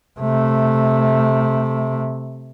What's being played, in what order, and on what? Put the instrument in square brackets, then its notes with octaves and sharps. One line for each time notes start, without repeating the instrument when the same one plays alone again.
[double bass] C3 A3